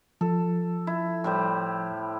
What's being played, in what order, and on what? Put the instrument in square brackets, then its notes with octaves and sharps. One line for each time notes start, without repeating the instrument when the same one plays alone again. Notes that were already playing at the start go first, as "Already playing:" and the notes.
[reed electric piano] F3 [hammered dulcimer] A4
[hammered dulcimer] E4
A2 G3 C5